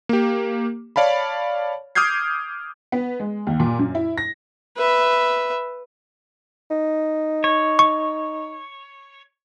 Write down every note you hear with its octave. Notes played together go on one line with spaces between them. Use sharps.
A#3 G4
C#5 D5 F5 A5 B5
D6 D#6 F6 G6 G#6 C7
B3
G#3
D#2
A#2
F#2
E4
A#6
B4 E5
D#4
C#5
C#6